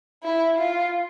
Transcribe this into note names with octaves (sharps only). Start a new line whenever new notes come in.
E4
F4